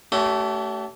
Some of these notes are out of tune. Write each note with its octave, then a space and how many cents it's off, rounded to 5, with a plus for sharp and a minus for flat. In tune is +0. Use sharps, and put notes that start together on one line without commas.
A3 +0 C#4 +40 G4 -40